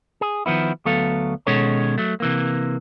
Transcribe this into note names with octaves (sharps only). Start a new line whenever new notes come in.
G#4
D#3 F3 B3 E4
D2 F#3 B3 A4 F5
B2 D#3 G#3 C#4 A4 C#5
F#3 A3
C3 E3 A#3